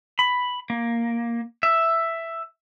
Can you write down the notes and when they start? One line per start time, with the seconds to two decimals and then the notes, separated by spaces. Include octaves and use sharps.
0.19 B5
0.70 A#3
1.63 E5